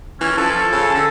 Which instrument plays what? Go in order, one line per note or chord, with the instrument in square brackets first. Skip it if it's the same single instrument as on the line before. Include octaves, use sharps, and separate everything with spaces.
[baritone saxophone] E3 [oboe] C#4
[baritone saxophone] F3 [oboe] A4
[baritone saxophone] C#3
D3